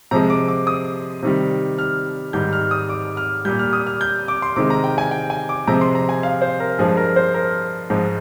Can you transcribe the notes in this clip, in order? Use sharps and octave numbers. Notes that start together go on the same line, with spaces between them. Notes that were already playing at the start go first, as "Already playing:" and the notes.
C3 F3 G#3 A#5
D6
D6
D#6
C3 D#3 G3
F6
G#2 D#3 G3 G6
F6
D#6
D6
F6
A#2 G3 G6
F6
D#6
F6
G6
D6
C6
C3 D#3 G#3 D6
A#5
G5
G#5
G5
G#5
D6
C3 F3 G#3 A#5
C6
A#5
G#5
F5
C5
A#4
G2 F3 G#3 G#4
A#4
C5
A#4
G#2 F3 G#3